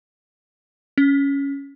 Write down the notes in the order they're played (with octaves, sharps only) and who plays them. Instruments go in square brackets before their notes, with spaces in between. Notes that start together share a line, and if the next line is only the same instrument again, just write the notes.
[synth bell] C#4